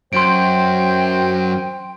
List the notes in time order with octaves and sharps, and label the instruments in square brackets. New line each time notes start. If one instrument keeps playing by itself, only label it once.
[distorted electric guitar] F#2 [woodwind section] C5 G5 [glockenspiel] C6 D7